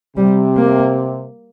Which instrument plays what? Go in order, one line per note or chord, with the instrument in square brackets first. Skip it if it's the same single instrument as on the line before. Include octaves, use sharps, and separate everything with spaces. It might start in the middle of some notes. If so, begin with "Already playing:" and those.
[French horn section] C3 [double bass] G3
[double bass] A#3